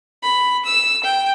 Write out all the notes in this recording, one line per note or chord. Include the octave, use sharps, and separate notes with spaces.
B5
E6
G5